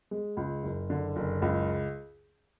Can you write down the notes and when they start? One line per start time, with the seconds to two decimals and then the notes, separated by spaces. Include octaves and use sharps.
0.11 G#3
0.37 C#2
0.63 F#1
0.90 D3
1.16 F#1
1.42 C#2